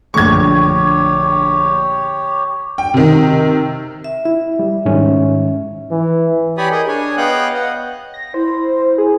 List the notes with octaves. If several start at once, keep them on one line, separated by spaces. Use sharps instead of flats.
A#1 D3 A3 G4 C#5 C#6 G#6
G5
C3 D#3
E5
E4 E5
G3
G#2 D#3 C#4
E3
G4 C#5 D5 G#5 B5 D#6
G#4 A#4 D#5
D4 G#4 C#5 G#5
B3 C#5 D#5 F5 G5 F#6
D#5 F#5
A#6
E4 C5
G#4